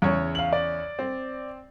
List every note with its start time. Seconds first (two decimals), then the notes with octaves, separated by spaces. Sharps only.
0.02 E2 C#3 C#5
0.35 F5 F#7
0.53 D5
0.99 C4